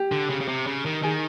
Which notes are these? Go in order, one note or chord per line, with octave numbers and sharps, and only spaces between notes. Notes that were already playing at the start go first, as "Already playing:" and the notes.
Already playing: G4
D3
C#3
C#3
C3
C#3
D#3
D#3 G#4